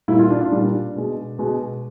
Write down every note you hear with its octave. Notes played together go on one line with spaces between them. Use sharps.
A#2 G3 E4
F4
D4
F4
A#2 G3 D4
B2 G#3
B2 G#3